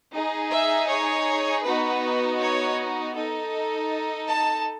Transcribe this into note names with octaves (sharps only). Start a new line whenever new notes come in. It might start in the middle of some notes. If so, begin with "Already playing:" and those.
D#4 G#4
E5
C#5
B3 D#4 F#4 B4
C#5
D#4 A4
A5